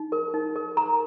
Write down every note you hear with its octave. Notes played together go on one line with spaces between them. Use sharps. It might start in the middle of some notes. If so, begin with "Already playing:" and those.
Already playing: D#4
A#4
D#4
A#4
A#4 A#5